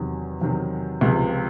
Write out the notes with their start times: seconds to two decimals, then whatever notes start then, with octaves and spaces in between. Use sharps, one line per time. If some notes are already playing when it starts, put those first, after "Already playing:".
Already playing: E2 C3 D#3 F#3
0.41 E2 C3 D#3 F#3
1.01 C#2 C3 F3 G#3